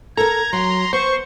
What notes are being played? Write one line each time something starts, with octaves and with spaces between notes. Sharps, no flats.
A4 A#4 A#5 G#6
F#3 C6
B3 C5 C#6